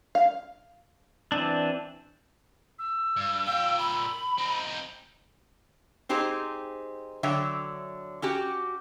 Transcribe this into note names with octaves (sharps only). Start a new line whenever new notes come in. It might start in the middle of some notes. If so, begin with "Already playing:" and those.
F5
E3 C4 D4
E6
G2
A#2 F5 G5
B5
C4 D#4
C4 D#4 G4 G#4 C5
D3 F#3 C#5 E5 G5
C#4 F#4 G4